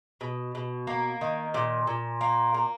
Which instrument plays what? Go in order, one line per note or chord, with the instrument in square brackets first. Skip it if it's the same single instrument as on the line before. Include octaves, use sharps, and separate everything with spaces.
[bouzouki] B2
B2
A#3
D#3
A#2
A#2
A#3
A#3